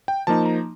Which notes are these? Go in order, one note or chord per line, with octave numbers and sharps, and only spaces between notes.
G5
F3 A#3 D#4 A5
A#5